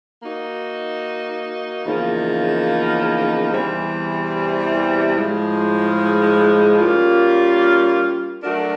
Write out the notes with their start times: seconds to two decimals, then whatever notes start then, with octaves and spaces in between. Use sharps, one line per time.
0.21 A#3 D#4 F#4
1.85 E2 C#3 F3 A#3 D#4
3.49 E2 C3 E3 G3 C4
5.14 A2 F3 G#3
6.78 G3 A#3 C#4 F4
8.43 F#3 A3 D4 F#4 A#4